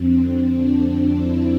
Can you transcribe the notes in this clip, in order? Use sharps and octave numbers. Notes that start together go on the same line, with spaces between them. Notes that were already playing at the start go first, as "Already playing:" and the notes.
Already playing: F2 D3 C4
D4
E4